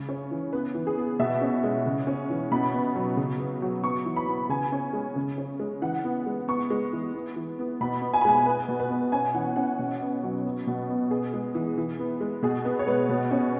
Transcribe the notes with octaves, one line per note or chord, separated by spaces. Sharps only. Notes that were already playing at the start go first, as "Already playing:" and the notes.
Already playing: C#3 G#3
C#4
E3
B3 B4
E3
G#4
B3
B2 E5
C#4
G#3
C#3
C#4
E3
B2 B5
B3
F#3
C#3
B3
F#3
B3 C#6
E3
B5
B3
C#3 G#5
C#4
G#3
C#3
C#4
G#3
E3 F#5
B3
G#3
B3 C#6
G#3
E3
B3
E3
B3
B2 B5
B3
G#5
B5
G#3 G#5
B3 B4
B2
B4
B3
C#4 G#5
E3 F#5
C#4 F#5
B2
B3
F#3
B3
B2
B3
B3 G#4
G#3
E3
E3
B3
G#3
B2 G#4
B3 B4
C#5
G#3 B4
B2
C#4